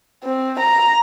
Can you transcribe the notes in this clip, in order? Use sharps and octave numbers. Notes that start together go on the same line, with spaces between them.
C4
A#5